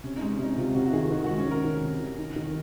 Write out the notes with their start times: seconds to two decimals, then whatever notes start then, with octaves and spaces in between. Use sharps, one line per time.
0.04 C3 C#4
0.17 G#3 D#4
0.30 C#4
0.39 C3 D#4
0.57 C3 F4
0.74 C3 F#4
0.85 F#4
0.93 D#3 G#4
1.11 D#3 F#4
1.24 G#3 F#4
1.38 C#4
1.47 D#3 A#4
1.65 D#3
1.83 C3
2.00 D#3
2.19 D#4
2.36 D#3